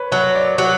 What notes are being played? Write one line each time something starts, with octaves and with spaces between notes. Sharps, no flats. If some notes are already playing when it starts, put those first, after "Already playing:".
Already playing: B4 C#5
F#3 C#5
D5
F#3 C#5